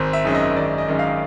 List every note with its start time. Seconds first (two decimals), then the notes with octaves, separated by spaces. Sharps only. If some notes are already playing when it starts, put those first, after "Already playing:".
Already playing: G#1 C5
0.13 E5
0.25 F#2 D#3 G#3 C#4
0.35 D#5
0.57 G#1 D5
0.78 D#5
0.88 F#2 D#3 G#3 C#4
0.99 F5